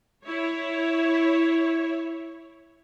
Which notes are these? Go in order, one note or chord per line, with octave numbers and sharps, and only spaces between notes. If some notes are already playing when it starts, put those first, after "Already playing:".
E4 C#5